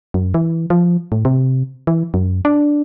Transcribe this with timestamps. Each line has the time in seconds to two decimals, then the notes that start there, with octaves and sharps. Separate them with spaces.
0.14 F#2
0.34 E3
0.70 F3
1.12 A2
1.25 C3
1.87 E3
2.14 F#2
2.45 D4